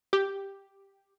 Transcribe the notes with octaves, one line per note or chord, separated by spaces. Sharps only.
G4